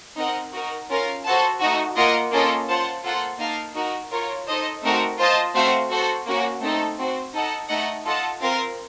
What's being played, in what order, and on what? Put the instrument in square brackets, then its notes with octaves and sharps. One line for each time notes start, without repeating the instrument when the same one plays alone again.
[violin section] C4 D#4 A#4 D#5 F#5
D#4 F#4 A#4
C#4 F4 A#4 F5
F#4 A4 C5 F#5 A5
A3 D#4 F#4
A#3 F4 A#4 D#5 F#5
A#3 C#4 F4 A4 D#5
F4 C5 F#5 A5
A#3 F4 A4 C5 F#5
A#3 D#4 A#4 F5 A5
D#4 F#4 A#4
F4 A#4 C#5
D#4 A4 C5 D#5
A3 C4 D#4 F#4 A#4
F4 C5 D#5 A5
A3 C4 F#4 C5 F5
F#4 A4 C5
A#3 C#4 F#4
A3 C4 D#4 A4
C4 F#4 C5
D#4 A4 D#5 F#5 A5
A3 D#4 A4 D#5 F#5
F4 A4 D#5 F#5 A5
C4 F4 A#4 F5